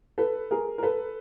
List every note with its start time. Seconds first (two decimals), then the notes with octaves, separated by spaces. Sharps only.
0.18 A4 B4
0.51 G#4 A#4
0.78 A#4
0.83 A4 B4